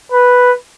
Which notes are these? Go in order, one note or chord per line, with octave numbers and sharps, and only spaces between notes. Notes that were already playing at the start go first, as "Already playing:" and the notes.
B4